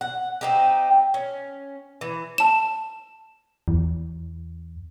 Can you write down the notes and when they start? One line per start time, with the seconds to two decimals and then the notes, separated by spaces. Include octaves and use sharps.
0.01 F#5
0.41 C4 D#4 G4
1.14 C#4
2.01 E3
2.38 A5 E7
3.68 E2